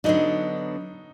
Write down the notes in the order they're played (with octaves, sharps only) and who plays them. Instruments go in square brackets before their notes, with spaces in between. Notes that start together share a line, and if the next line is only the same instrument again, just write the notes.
[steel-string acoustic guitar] D3 F#3 B3 D4 [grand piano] D#4